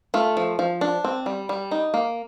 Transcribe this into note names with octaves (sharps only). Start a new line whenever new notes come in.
A3 F4
F3
F3
D4
C4
G3
G3
D#4
A#3